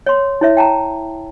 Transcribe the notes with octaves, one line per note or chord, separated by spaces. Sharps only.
C#5 C6
E4 C#5 E5
G5 A5 A#5